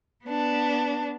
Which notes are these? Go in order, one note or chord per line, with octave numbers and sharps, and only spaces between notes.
B3 D4